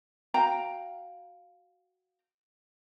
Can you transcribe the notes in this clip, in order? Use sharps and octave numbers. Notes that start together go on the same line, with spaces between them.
F#4 F5 G5 A#5